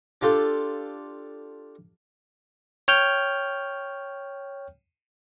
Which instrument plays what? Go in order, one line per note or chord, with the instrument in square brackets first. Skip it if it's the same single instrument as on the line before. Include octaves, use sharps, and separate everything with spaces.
[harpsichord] D4 F4 G4 A4
[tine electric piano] C#5 G5 F6 G6